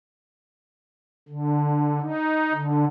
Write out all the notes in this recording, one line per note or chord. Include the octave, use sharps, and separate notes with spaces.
D3
D#4
D3